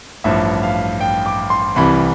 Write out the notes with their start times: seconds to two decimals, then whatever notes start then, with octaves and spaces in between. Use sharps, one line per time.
0.24 A1 G2 F3 E5
0.63 F5
1.01 G5
1.26 D6
1.50 C6
1.76 C2 C3 E3 G3 B5